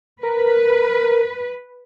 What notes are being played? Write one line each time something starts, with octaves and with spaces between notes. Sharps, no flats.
A#4 B4